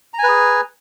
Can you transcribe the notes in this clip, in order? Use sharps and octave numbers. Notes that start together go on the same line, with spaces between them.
G#4 B4 G#5 A#5